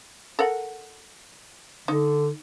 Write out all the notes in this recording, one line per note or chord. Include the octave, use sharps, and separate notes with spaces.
A4 A#4 F#5
D3 D#4